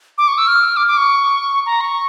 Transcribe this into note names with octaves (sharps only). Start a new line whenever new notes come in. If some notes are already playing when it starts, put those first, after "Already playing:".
D6
C#6
E6
F6
D6
D6
C#6
A#5
C#6